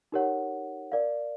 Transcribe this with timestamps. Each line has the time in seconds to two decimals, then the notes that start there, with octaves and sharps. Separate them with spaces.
0.12 D#4 G4 A#4 C#5 F#5
0.92 A#4 D5 F5